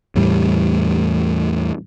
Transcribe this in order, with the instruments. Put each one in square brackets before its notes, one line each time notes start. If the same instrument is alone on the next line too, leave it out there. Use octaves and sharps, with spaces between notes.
[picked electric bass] E2 A2 E3 G3